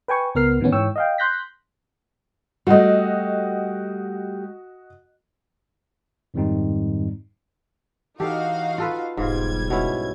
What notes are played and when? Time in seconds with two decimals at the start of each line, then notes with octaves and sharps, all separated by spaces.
0.08 B4 G5 G#5 C#6
0.35 C#2 B3 A#4 F6 C7
0.61 A2 D#3 E3 B3 C#4
0.72 G#2 E3 C#5 G5 C#6 E6
0.96 D#5 F5 G5
1.18 C6 F#6 G6 A#6 B6
2.67 G3 A3 F#4 D#5
6.34 F2 G#2 D#3 G3 C4 D#4
8.20 E3 D#4 F#4 G4 A4 F5
8.78 F4 A4 B4
9.17 E1 B1 G#2 G3 F4 G#6
9.70 B2 C#4 E4